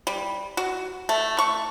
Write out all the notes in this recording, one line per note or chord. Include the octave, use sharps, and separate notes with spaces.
G3
F#4
A3
C#6